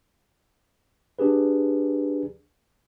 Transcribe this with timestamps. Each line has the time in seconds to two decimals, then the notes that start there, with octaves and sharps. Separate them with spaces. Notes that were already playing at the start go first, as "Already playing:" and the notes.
1.19 D4 G4 G#4 B4